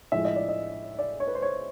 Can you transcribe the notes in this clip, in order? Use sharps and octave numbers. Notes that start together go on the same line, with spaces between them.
A2 F3 G#3 E5
D#5
D5
D#5
D5
C#5
B4
C5
C#5